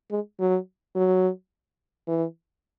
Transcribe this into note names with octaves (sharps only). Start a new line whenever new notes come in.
G#3
F#3
F#3
E3